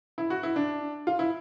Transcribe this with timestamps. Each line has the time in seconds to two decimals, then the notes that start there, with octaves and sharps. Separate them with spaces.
0.18 E4
0.30 F#4
0.43 E4
0.56 D4
1.07 F4
1.19 E4